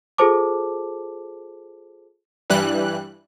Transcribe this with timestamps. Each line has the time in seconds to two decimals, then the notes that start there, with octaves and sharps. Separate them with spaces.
0.18 F4 G#4 A4 C5 A5 D6
2.50 G2 E3 G3 F#6